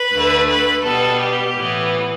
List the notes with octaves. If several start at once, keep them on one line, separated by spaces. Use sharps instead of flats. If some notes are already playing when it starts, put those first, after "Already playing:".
Already playing: B4
D2 D3 A3
B4
B2 G3 B3 A4
G4
A2 E3 B3